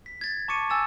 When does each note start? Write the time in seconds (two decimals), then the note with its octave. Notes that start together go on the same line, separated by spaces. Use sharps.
0.06 B6
0.21 G#6 A6
0.48 A5 C#6 D6 C#7 D#7
0.70 G#5 E6 A6 E7